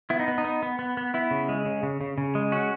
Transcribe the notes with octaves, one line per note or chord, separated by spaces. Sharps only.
B3 E4
D#4
B3
D#4
B3
B3
B3
B3
B3 E4
C#3
G#3
C#3
C#3
C#3
C#3
G#3
C#4 F#4